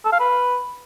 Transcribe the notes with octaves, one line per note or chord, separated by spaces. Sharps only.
A4
F5
B4